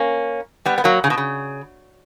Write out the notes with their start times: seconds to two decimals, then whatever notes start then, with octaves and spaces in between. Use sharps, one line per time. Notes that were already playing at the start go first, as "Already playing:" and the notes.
Already playing: A#3 C#4
0.66 G3 B3
0.78 B3
0.84 F#3 A#3
1.04 C#3
1.10 B2
1.18 C#3